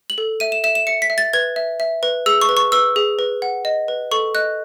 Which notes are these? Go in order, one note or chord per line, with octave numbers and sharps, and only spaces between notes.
F#7
A4
E5 D#7
E7
E5 E7
E7
E5 C#7
B6
E5
A6
B4 G#6
E5
E5
B4
G#4 E6
C#6
B4
C#6
B4 E6
G#4
B4
F#5
D#5
B4
A4 C#6
D#5 F#6